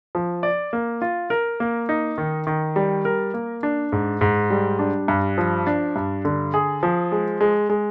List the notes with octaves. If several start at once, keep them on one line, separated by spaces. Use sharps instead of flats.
F3
D5
A#3
F4
A#4
A#3
D#4
D#3
D#3
G3
A#4
A#3
D4
G#2
G#2
G3
D4
G2
F3
D4
G2
D3
G#4
F3
G#3
G#3
G#3